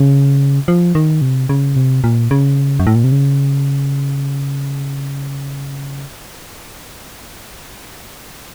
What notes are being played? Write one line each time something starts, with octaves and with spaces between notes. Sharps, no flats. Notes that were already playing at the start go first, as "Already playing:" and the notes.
Already playing: C#3
F3
D#3
C3
C#3
C3
A#2
C#3
F#2
A2
A#2
C3
C#3